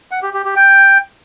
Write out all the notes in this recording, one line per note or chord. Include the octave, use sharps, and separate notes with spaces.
F#5
G4
G4
G4
G5